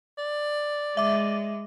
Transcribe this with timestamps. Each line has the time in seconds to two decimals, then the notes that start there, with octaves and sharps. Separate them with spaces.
0.18 D5
0.97 G#3 E5 D6